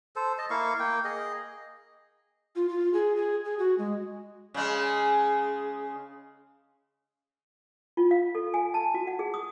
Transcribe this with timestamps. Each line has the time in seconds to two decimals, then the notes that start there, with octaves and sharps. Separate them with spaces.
0.16 A4 C5
0.38 D#5 A5
0.50 A#3 E4 F5 C#6
0.80 A#3 G5
1.04 G#4 D#5
2.56 F4
2.69 F4
2.94 G#4
3.16 G#4
3.45 G#4
3.59 F#4
3.78 G#3
4.54 C#3 G#3
7.97 F4
8.11 F5
8.35 A4
8.54 G#5
8.74 A5
8.94 F#4
9.07 F#5
9.19 G#4
9.34 D#6